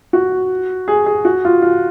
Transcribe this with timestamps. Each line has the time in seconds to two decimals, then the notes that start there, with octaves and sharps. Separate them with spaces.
0.13 F#4
0.88 G#4
1.06 G#4
1.25 F#4
1.45 F4
1.62 F4